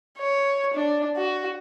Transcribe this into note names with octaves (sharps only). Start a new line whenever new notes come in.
C#5
D4
F#4